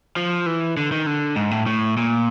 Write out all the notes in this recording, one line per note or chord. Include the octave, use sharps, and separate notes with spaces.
F3
E3
D3
D#3
D3
G#2
A2
A2
A#2